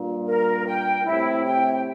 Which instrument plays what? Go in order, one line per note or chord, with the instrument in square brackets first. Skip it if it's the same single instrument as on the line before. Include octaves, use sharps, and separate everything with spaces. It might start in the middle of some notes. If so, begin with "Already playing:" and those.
Already playing: [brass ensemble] G2 A#2
[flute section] A#4
G5
[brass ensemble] A2 C3 [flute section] E4
[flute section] G5